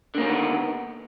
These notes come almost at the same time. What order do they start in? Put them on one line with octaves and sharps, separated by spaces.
D3 A#3 C#4 D#3 B3